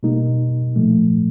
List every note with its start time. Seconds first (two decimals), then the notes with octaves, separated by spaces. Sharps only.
0.03 B2 G3 A#3 D#4
0.76 A#2 F3 A3